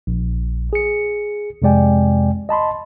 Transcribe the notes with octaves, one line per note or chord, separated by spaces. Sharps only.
A#1
G#4 C#7
F2 C3 G#3 D5 G5 G#5
D#5 A5 B5 C6